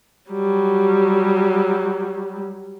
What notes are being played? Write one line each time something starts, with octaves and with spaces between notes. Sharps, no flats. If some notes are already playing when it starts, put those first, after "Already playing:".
F#3 G3